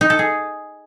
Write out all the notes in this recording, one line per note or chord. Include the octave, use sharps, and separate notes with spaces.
D#4
A4
G#4